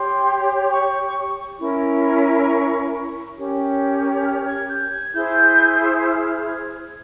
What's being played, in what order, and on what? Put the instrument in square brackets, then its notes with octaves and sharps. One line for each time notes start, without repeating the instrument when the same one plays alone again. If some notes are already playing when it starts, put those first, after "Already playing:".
Already playing: [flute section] G4 C#5 C6
C#6
C#4 E4 A#4
C#6
C#6
C#4 G4 A#4 C#5
F6
G#6
G6
G#6
E4 G#4 C5 G6
G6
F6
E6
F6
G#6